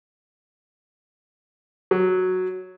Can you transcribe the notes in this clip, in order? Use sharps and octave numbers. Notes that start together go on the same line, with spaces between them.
F#3